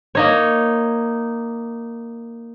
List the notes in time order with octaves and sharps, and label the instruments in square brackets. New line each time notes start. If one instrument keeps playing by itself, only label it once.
[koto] A#3 D#4 C#5